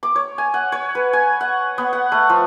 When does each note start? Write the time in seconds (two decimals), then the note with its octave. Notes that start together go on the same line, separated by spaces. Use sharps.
0.03 D6
0.16 C#5
0.38 G#5
0.54 F#5
0.72 C#5
0.95 B4
1.13 G#5
1.41 F#5
1.78 B3
1.93 F#5
2.12 A3
2.29 F3